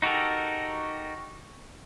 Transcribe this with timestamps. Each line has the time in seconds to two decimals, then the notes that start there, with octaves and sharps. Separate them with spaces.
0.02 D#4 F#4 G4 A4 A#4